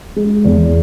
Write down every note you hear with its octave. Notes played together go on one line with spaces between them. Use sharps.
G#3
E2